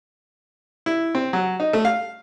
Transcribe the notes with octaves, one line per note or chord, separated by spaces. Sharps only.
E4
C4
F#3
D#4
A3
F5